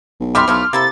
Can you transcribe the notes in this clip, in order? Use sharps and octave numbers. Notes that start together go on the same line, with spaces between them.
B1
G3 E5 B5 C6 D6 F6
B1 F3 A3 E4
C3 A#3 E4 A4 A6